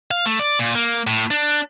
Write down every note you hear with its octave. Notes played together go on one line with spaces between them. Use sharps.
F5
A3
D5
A#2
A#3
A2
D4